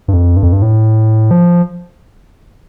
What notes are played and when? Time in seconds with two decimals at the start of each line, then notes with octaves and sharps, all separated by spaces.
0.08 G2
0.14 F2
0.36 G2
0.43 F2
0.53 G2
0.62 A2
1.31 F3